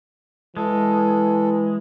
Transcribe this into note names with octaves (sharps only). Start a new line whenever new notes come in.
E3 G#3 A4